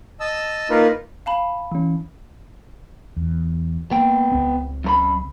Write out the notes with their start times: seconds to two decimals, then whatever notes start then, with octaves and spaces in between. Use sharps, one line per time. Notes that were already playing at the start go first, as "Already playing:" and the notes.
0.20 D#5 A5 E6
0.70 A#3 D#4 F4 A#4 B4
1.26 F5 A5 B5
1.72 E3 C#4
3.17 E2
3.91 A#3 B3 G5
4.32 C#2 C4
4.84 F#2 A#4 B5